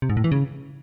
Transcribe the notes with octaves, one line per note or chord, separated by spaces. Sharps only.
C3
G#2
A2
E3
C#3